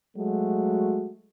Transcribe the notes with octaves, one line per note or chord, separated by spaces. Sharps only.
F#3 G#3 A3 F#4